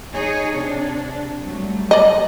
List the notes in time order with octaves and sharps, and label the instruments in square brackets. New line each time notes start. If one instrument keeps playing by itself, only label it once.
[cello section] D#4 G#4 C#5
C3 D4
F#3 G3 A3
[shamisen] D5 D#5